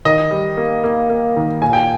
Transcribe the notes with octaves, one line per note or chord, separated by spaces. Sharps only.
D#3 D#5
G3
A#3
A#3
A#3
D#3
A#2 G#5
G5